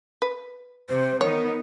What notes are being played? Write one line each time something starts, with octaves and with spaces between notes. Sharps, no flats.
B4
C3 C5
D#3 B3 D#4 A#4 C#5